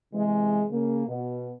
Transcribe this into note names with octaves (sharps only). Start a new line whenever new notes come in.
C3 E3 G#3
C#3 A#3
B2